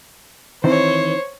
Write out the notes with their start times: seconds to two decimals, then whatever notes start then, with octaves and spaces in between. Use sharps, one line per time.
0.64 D#3 E3 C4 C5 C#5